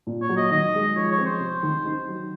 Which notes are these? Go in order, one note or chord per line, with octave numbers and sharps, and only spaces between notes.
A#2
C#5
F#3
D#5
D#3 D#5
G#3
F3 C#5
C#5
C4
C5
C3
D#3
D#4
F#3